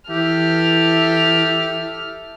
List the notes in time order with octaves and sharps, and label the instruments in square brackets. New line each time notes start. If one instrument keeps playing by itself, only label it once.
[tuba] E3 [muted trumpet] G4 [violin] A4 F6 [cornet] E5